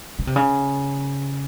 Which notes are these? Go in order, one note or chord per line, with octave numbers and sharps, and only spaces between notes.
C#3
C3
C#3